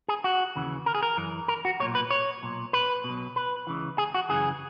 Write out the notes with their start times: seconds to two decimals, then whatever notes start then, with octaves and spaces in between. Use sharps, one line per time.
0.08 G#4
0.24 F#4
0.56 D#2 C#3 E3
0.86 A#4
0.95 G#4
1.03 A#4
1.17 F#2 E3
1.48 A#4
1.65 F#4
1.80 B1 A#2 C#5
1.95 B4
2.11 C#5
2.43 B1 A#2
2.73 B4
3.04 B2
3.10 B1
3.36 B4
3.67 C#2 C#3 E3
3.98 G#4
4.14 F#4
4.29 F#2 C#3 E3 G#4